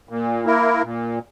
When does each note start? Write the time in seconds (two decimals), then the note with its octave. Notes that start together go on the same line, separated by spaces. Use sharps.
0.09 A#2
0.45 A#3 E4 A#4
0.82 A#2